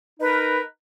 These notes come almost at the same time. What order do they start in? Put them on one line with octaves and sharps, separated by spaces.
D#4 B4 A#4